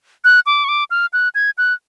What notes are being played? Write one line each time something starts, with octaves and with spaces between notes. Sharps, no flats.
F#6
D6
C#6
D6
F6
F#6
G#6
F#6